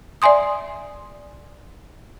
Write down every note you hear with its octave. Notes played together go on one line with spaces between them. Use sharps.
D5 E5 G#5 C6 D#6